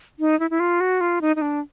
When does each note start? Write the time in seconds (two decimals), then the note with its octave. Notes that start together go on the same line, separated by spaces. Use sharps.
0.19 D#4
0.40 E4
0.51 E4
0.60 F4
0.80 F#4
1.01 F4
1.21 D#4
1.36 D#4
1.42 D4